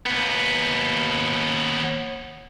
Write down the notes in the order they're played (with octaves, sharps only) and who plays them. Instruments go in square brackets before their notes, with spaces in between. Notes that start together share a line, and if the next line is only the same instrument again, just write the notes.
[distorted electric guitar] D#2 B3